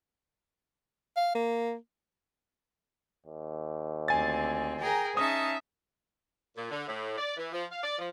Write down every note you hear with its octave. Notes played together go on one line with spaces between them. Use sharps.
F5
A#3
D#2
D2 C4 G#5 A6
G#4 A#4 G5 A#5
C#4 D#4 E5 A5 D#6
A#2
D3
A2
D5
E3
F3
F5
D5
F3